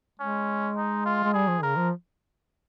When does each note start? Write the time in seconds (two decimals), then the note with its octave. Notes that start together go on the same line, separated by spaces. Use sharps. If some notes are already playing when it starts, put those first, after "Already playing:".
0.20 G#3 C#4
0.77 D#4
1.06 F4
1.24 G#3
1.34 G3 G#4
1.48 F3
1.63 C#3 A#4
1.77 F3